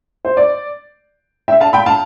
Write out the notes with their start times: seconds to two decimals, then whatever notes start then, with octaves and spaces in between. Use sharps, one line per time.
0.25 C5
0.37 D5
1.48 E5 G5
1.60 F5 A5
1.73 G5 B5
1.86 F5 A5